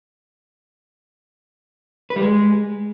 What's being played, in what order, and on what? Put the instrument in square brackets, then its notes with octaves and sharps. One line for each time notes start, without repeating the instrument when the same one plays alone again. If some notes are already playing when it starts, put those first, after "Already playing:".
[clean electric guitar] B4
G3
G#3